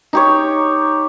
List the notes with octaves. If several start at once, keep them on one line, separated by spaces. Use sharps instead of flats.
D#4 G4 C#5